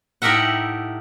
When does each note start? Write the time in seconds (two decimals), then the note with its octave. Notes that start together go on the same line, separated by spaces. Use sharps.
0.22 A2 D#4 G4 A#4 E5 F#5